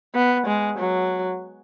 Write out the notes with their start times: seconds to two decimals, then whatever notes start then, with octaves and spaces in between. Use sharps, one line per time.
0.15 B3
0.47 G#3
0.78 F#3